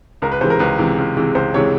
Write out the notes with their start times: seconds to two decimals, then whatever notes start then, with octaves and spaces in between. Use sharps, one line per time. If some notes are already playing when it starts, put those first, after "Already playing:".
0.22 C#2 A#4
0.32 B4
0.41 C3 E3 G#3 C5
0.50 A#4
0.59 C#2 B4
0.78 C3 E3 G#3
0.98 C#2
1.17 C3 E3 G#3
1.35 C#2 C5
1.54 C3 E3 G#3 C#5